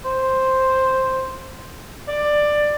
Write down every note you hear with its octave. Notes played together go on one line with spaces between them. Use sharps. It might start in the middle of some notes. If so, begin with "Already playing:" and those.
C5
D5